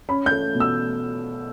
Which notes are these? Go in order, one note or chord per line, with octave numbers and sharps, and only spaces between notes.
C#4 B5
G6
A3
B2
E6